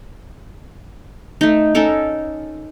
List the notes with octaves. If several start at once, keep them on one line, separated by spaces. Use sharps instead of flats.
A3 D#4
C#4 D#4 A4 A#4